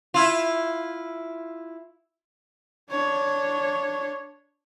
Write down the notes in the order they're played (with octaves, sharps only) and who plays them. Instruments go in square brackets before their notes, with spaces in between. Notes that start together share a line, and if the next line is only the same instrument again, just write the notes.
[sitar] E4 F4
[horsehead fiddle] D4 C#5